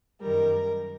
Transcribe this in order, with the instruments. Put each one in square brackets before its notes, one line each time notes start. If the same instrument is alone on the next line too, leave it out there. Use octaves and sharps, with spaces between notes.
[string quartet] F#2 D#3 G3 A#4